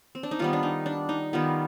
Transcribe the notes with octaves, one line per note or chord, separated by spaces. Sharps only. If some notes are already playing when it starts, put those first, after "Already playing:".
C4
D4
D#4
D#3 G3 B3 F4
D4
D#4
D4
D#4
D#3 G3 B3 F4